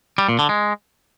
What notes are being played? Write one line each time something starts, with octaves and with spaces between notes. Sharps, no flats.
G3
A#2
D3
G#3